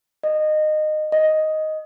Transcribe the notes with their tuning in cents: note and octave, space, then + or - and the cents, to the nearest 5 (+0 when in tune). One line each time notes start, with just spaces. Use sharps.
D#5 -20
D#5 +5